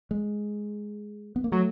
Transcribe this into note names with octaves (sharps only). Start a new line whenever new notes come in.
G#3
B3
A#3
F#3 A3